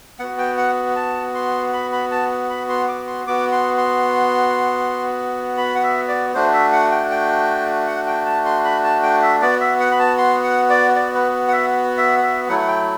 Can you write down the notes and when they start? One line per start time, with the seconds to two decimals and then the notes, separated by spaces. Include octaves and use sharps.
0.19 B3 F#4 F#5
0.38 G5
0.57 F#5
0.96 A5
1.35 C6
1.73 B5
1.92 B5
2.11 A5
2.50 B5
2.69 C6
2.88 D6
3.07 C6
3.26 B3 F#4 D6
3.52 C6
3.77 C6
5.57 B5
5.75 F#5
5.83 E5
6.08 D5
6.34 A3 D4 F#4 C5
6.53 E5
6.72 F#5
6.91 G5
7.11 G5
7.87 F#5
8.07 G5
8.26 A5
8.45 C6
8.64 B5
8.84 A5
9.03 G5
9.22 E5
9.41 B3 F#4 D5
9.61 E5
9.80 F#5
9.91 B5
9.99 A5
10.18 C6
10.44 F#5
10.69 D5
10.95 D5
11.14 B4
11.48 F#5
11.52 E5
11.97 E5
12.23 E5
12.49 F#3 A3 E4 F#5
12.59 F#5
12.68 G5